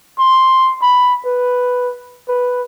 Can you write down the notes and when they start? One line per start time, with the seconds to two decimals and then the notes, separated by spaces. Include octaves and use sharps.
0.19 C6
0.82 B5
1.25 B4
2.28 B4